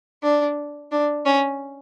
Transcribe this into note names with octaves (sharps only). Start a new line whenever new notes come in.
D4
D4
C#4